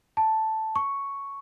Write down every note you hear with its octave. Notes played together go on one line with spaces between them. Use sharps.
A5
C#6